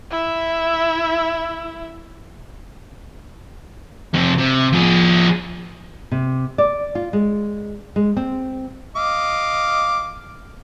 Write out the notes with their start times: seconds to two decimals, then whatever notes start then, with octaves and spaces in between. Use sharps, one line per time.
0.11 E4 E5
4.14 F2 C3
4.38 C3
4.73 F3 G#4
6.12 C3
6.58 D5
6.95 F4
7.13 G#3
7.96 G#3
8.17 C4
8.96 D#5 F5 D6